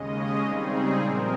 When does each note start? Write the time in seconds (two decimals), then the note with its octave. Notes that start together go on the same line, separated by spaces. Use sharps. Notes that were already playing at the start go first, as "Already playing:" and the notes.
Already playing: D#2 C#3 G#3 C#4 D#5
0.40 C#3 G3 C4 D#4 G#4
0.97 A#2 F3 C4 A#4